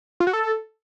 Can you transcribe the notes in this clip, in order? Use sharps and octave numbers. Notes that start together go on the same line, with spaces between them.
F4
F#4
A4